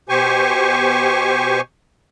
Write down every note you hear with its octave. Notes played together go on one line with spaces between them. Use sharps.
B2 G4 C5 G#5 C#6